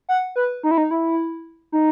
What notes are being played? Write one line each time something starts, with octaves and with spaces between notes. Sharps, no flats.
F#5
B4
D#4
E4
D#4
E4
D#4